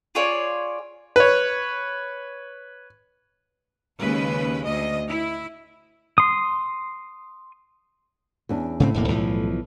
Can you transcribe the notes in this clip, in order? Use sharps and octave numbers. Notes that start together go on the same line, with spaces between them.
F4 G#4 C#5 D5
B4 C#5
D#2 C#3 G#3 B4
D2 D#5
E4
C6 D#6
E2 C#4 D4
A2 C#3 A#3 C4
E1 E2 A#3
B1 E3 F3